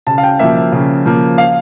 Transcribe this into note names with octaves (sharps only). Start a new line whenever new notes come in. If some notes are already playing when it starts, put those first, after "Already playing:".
C#3 A5
F5
G5
F3 A#3 E5
E5
C#3
F3 A#3
F5